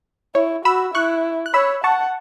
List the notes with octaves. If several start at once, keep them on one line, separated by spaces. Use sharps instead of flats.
E4 C#5
F#4 B5 E6
E4 C#6 F#6
F#6
C#5 B5 E6
F#5 A5 C#6